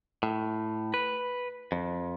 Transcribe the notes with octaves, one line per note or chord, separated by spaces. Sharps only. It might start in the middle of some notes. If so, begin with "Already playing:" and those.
A2
B4
F2